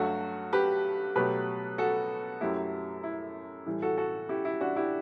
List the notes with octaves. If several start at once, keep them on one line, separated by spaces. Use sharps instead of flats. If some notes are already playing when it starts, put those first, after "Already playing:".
Already playing: G2 F#3 A3 F#4 A4
G4 B4
B2 F#3 A3 G4 B4
F#4 A4
F#2 F#3 A3 E4 G4
E4
A2 E3 G3
F#4 A4
F#4 A4
E4 G4
E4
D4 F#4
E4 G4